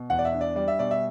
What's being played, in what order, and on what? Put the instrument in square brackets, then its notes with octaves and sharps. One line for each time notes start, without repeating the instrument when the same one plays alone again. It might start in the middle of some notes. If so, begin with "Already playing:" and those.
Already playing: [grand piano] B2
E2 F#5
D5
E5
D4
D5
G3 D5
E5
B2 D5
E5